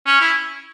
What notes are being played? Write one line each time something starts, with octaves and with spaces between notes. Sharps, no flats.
C#4
E4